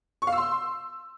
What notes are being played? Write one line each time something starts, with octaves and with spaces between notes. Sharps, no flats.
C#6
F5
E6
C6